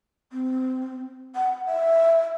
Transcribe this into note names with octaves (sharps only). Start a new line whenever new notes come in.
C4
F#5
E5